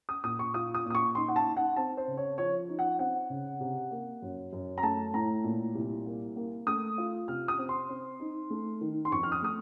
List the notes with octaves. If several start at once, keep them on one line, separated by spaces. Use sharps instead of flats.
D#6
A#2 D#6
C#6
F4 D#6
D#6
A#2 D#6
C#6
D#4 C6
F#5
A5
D#4
F#5
C4 A5
C5
C#3
C#5
F3 C#5
D#4
F#5
C4 F#5
C#3
C3
A#3
F#2
F#2
A#5
A3 A5
A2 A#5
A#2
C2
A#3
A#3
A3 D#6
F4
C3 F6
D#6
C4
C6
C4
D#4
A3
D#3
C6
F2 C#6
F6
D#6
A3 D#6